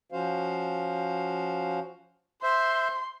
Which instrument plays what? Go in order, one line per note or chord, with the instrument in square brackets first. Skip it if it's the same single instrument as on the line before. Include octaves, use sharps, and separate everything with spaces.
[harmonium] F3 C#4 F#4 C5 F5
[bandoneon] C5 E5 [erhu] C6